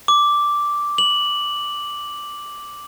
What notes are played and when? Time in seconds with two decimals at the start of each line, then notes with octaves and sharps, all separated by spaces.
0.08 D6
0.98 F#7